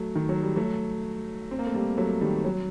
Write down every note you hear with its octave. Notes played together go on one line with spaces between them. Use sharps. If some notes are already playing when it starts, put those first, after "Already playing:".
Already playing: F#3 A3
D#3
F#3
G3
F#3 A3
C4
A#3
A3
G3 A#3
F#3 A3
D#3 G3
F#3